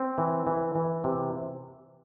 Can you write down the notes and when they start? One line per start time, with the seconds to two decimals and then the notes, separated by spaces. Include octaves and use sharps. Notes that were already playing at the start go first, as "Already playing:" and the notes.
Already playing: C4
0.18 E3
0.47 E3
0.75 E3
1.04 C3